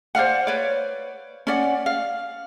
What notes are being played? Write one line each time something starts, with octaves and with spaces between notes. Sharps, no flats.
C5 D5 F5 F#5
B4 C#5 D5
C#4 D5 F#5
F5